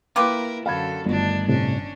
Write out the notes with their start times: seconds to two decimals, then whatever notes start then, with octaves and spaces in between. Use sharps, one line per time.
0.16 A#3 E4 F4 G4 A#4 B4
0.66 F#2 D3 A4 F5 B5 G#6
1.05 G1 D#3 A3 D4
1.48 A2 C3 C#4 D4